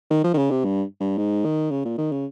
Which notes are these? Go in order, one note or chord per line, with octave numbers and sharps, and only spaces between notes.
D#3
F3
D#3
C#3
C3
G2
G2
G#2
D#3
C#3
A#2
D#3
C#3